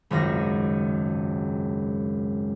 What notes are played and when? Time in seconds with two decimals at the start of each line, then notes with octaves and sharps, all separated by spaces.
0.10 G#1 C#2 F#2 A#6